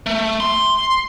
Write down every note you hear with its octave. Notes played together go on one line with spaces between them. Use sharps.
A3
C6